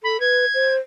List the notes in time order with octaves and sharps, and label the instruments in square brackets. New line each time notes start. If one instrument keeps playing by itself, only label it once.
[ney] A4 [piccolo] B5
[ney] B4 [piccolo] G#6
[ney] C5